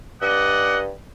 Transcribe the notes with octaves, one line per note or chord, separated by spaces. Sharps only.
G2 D5 D#5 F#5